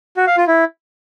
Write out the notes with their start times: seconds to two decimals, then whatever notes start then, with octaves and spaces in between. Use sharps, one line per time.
0.17 F#4
0.27 F5
0.37 F4
0.48 E4